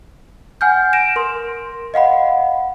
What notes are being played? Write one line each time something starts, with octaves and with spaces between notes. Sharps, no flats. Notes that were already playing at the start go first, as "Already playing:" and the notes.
F#5 G#5 F6 G6
A#6 D7 E7
A#4 C6
D#5 F5 F#5 B5